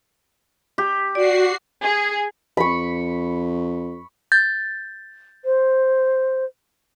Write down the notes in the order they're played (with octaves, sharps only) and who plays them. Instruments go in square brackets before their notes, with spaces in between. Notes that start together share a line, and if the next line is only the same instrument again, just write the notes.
[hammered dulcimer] G4
[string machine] F#4 C7 [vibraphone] D5
[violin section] G#4
[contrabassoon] F2 [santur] B5 C#6
[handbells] G6 A6
[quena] C5